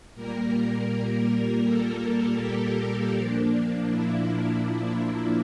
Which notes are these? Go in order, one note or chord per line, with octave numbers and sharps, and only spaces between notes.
A#2 G3 A#3 A#4
A4
G4
A#2 F3 A#3 D4
E4